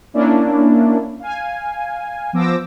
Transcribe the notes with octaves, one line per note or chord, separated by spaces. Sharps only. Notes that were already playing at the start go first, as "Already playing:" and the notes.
A#3 C#4 D4 E4
F5 G#5
F3 B3 C5 D6 E6 A#6